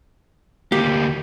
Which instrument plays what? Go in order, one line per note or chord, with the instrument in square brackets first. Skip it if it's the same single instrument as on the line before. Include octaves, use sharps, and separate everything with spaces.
[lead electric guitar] D2 A#3 [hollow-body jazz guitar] G4